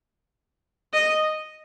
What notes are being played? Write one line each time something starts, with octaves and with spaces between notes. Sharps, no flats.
D#5